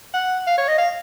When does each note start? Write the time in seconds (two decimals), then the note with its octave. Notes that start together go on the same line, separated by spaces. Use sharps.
0.14 F#5
0.47 F5
0.58 C#5
0.68 D#5
0.78 F5